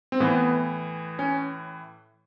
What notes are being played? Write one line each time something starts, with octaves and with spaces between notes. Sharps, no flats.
C4
A2 E3 B3
C#4